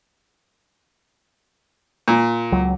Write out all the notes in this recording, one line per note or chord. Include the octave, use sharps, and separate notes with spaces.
A#2
C#2 F#3